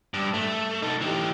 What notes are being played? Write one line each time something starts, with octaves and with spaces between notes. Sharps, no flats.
G2
A3
D#4 A4
E3 G4